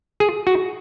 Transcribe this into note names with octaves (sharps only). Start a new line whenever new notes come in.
G#4
F#4